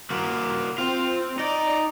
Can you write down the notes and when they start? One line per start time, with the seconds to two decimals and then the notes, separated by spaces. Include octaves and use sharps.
0.10 A#3 F#4
0.78 C4 F4
1.39 D#4 D5